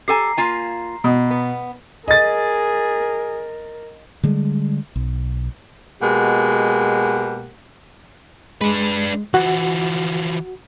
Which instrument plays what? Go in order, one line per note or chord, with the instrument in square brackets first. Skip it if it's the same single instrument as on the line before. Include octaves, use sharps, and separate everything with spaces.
[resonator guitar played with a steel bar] G4 A4 G#5 [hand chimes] A#5 C7
[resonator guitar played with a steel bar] A#3 F4 G#5
[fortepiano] B2
[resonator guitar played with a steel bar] B3
[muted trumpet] G#4 [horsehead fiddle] A#4 [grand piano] D#5 A6
[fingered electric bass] D3 G3 G#3
B1
[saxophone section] B2 G#3 A#3 G4 F#5
[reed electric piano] G#3 [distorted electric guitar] D4 B4
[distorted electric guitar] E3 F3 [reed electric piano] F#4 F#5